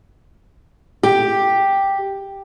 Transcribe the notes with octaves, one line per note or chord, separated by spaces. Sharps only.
G4